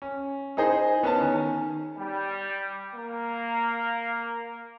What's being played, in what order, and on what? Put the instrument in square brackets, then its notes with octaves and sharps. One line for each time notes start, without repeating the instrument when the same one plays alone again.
[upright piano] C#4
D#4 E4 G#4 C5 D#5
B3 C#4 B4 G#5 A5
D#3 C#4
[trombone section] G3
A#3